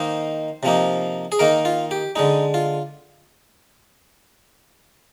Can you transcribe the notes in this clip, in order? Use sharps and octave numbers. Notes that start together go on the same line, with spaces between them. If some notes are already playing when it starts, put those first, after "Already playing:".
Already playing: D#3 A#3 D#4 C5
C3 F3 A#3 D#4
G#4
D#3 A#3 D#4 A#4
F4
G4
D3 G#3 D#4
F4